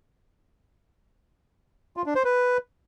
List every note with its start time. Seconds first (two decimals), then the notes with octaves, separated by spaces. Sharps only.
1.97 F4
2.06 D4
2.15 C5
2.25 B4